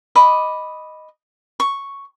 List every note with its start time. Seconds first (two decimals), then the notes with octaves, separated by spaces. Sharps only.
0.15 D#5 B5 D6
1.60 C#6